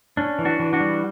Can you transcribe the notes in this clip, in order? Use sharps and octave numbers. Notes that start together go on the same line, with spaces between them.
C#4 D4
E3
D4 F#4
E3
D4 F#4
G3